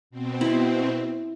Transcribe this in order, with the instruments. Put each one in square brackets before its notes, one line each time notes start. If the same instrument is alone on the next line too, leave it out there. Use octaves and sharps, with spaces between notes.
[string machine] B2 C4
[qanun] E4